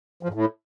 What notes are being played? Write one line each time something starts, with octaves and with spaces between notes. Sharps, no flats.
F3
G#2
A2